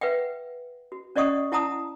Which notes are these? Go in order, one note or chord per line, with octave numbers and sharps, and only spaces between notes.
B4 E5 F#5 G5
F#4
C#4 D5 D#5 F#5 C#6 D#6
E4 F#5 A5 A#5 D#6